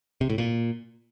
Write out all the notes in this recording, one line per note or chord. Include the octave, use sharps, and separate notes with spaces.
C3
A2
A#2